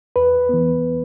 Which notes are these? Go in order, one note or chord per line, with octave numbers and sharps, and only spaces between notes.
E2 B4
E3 B3